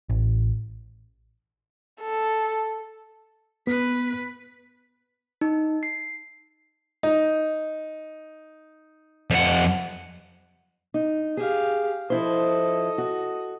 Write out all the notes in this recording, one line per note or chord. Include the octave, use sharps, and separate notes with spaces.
A1
A4
B3 B4 B6
D#4
C7
D#4
F2 F#5
D#4
G4 G#4 F5
F3 E4 A4 C5 D#5
F#4